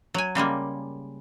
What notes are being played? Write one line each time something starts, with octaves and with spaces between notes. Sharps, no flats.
F#3 G#5
C#3 G3 G#3 A#3